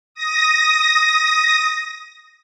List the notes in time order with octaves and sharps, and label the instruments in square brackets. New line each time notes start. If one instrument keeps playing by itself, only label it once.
[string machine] D#6 A#6